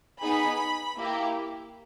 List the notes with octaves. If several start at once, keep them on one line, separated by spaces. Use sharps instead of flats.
B3 D#4 G#4 B5
A#3 E4 G4